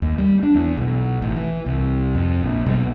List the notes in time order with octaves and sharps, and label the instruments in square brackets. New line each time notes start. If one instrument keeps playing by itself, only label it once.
[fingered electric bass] D#2
G3
D4
E2
B1
A1
E3
C2
F2
A#1
B1